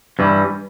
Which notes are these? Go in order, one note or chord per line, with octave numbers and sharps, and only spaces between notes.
G2 E3 G3